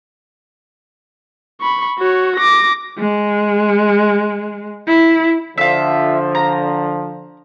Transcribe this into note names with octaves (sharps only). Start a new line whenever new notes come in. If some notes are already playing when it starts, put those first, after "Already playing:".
B5 C#6
F#4 C#5
D6 A#6
G#3
E4
D3 F3 F4 E5
A#5